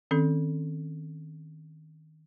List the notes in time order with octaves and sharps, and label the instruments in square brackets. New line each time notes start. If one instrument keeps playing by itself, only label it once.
[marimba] D#3 C4 C#4 A4